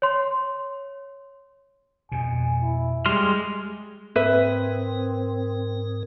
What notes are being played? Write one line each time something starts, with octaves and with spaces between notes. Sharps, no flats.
C#5 C6
F2 B2 G#5
E4
G3 G#3 C6 F6
G#2 C4 A#4 B4 E5